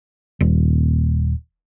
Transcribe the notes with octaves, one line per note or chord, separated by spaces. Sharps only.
D#1